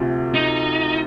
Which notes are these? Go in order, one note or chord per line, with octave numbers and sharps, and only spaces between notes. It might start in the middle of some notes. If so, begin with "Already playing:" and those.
Already playing: D2 C3 F3
D#4